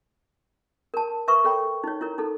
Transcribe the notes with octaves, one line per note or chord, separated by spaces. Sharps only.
A#4 A5
A#4 B4 E5 C#6
A4 C#5 G5 B5
D#4 C#5
E4 A#4 C#5
D#4 A4